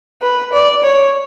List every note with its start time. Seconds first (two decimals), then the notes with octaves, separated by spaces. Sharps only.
0.22 B4
0.53 D5
0.84 C#5